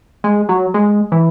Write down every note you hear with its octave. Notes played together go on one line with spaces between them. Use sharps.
G#3
F#3
G#3
E3